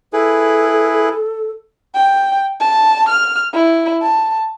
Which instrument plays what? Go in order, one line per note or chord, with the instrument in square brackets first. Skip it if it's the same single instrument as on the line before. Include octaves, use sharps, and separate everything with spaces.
[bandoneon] E4 G#4 B4 [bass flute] A4
[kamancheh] G5
A5
F6
E4
A5